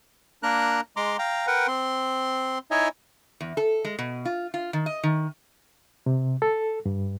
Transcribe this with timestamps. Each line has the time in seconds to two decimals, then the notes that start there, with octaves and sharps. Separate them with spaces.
0.43 A#3 D4 A#4 A#5 F#6
0.96 G#3 A#5 C6 D6
1.19 F5 G5 A#5
1.47 A#4 B4 F#5 G5
1.68 C4 C6
2.71 D#4 E4 C#5 D#5 E5 G#5
3.41 E2
3.57 A4
3.85 G#3
3.99 B2
4.25 F4
4.54 F4
4.73 D#3
4.86 D#5
5.03 D#3
6.06 C3
6.42 A4
6.86 G2